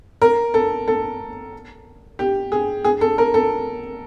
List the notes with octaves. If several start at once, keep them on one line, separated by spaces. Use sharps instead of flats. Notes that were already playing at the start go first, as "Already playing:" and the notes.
A#4
A4
A4
G4
G#4
G#4
A4
A#4
A4